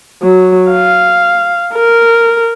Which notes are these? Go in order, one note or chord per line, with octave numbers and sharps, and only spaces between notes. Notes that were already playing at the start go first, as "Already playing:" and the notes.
F#3
F5
A#4